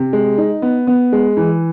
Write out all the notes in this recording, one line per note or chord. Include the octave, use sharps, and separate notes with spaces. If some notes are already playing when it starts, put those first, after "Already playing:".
Already playing: C3
G#3
D#4
B3
B3
G#3
E3